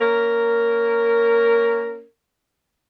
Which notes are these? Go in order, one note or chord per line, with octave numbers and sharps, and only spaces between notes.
A#3 C#4 A#4